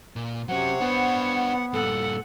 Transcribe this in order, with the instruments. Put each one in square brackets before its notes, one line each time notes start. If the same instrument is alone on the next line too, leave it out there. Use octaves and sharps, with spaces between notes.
[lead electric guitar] A#2
[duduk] C3 [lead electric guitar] F#3 C#4 [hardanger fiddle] C5 C#5 [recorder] F#5
[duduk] B3 [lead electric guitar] D4 B4
[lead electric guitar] G2 A#2 [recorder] A4 [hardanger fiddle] F#5